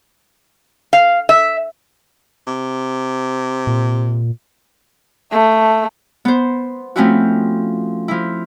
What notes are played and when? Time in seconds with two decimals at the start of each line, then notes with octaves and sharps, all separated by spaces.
0.93 F5
1.29 E5
2.47 C3
3.67 A#2
5.32 A3
6.25 B3 C5
6.96 F3 A3 C4 C#4 E4 F#4
8.08 F3 E4